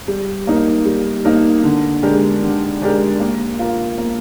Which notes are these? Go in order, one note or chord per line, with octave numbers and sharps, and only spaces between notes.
G3
A#3 D#4 A#4
G3
A#3 D#4 A#4
D3
G#3 D4 G4 A#4
D3
G#3 D4 G4 A#4
A#3
F4 A#4
A#3